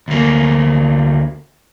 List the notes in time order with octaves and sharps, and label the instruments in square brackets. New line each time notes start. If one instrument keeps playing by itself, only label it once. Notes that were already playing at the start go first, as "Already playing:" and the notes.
[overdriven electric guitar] D2 A#3